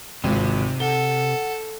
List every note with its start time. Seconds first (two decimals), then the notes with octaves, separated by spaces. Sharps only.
0.24 G#1 C#2 C3
0.80 A4 F#5 G7